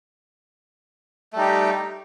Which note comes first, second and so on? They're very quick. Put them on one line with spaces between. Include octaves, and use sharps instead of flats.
A3 G3 D#4 G4